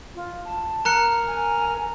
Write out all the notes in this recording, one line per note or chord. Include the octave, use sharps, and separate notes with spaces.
F4
A5
A#4 A#5 F6 F#6 C#7
G#5